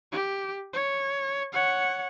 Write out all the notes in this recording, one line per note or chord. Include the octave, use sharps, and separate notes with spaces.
G4
C#5
C#5 F#5